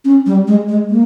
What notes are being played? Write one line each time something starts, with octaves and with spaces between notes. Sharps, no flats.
C#4
G3
G#3
G#3
A#3